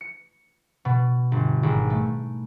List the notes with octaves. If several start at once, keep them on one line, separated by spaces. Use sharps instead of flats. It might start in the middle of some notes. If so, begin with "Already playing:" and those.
C#7
B2
G1
G#1
A3